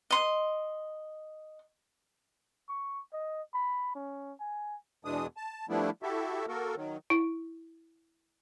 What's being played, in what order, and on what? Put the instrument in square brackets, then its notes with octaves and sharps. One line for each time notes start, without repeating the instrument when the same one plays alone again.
[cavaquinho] D#5 C6
[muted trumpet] C#6
D#5
B5
C#4
G#5
[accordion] E2 B2 E3 G#3 D4 D#6
A5
F3 G3 A3 B3 D4 E4
E4 F#4 G4 A4 E5
A#3 F#4 A4 A#4
D#3 F#3
[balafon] E4